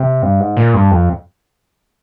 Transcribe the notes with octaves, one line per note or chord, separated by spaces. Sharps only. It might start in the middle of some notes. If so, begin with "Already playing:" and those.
Already playing: C3
G2
G#2
A#2
G2
F2